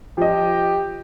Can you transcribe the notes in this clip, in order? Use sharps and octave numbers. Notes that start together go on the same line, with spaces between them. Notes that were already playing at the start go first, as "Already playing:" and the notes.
F3 G4 D#5